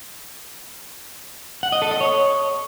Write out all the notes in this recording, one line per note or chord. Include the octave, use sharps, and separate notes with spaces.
F#5
D#5
A4
D#5
C#5